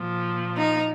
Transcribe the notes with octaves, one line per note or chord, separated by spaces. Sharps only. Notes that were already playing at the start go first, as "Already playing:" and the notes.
Already playing: A#2 F3
D#4